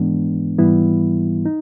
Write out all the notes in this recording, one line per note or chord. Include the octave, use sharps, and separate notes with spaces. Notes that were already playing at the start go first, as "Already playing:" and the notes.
Already playing: G#2 E3 G#3 B3 D4
G#2 E3 G3 B3 E4
D#4